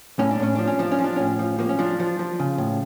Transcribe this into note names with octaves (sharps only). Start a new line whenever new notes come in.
A2 C#4
D4
A2 C#4
F3 D4
C#4
F3 D4
C#4
F3
D4
A2 C#4
F3
F3 A#3
C#4
F3 D4
F3
F3
C#3
A2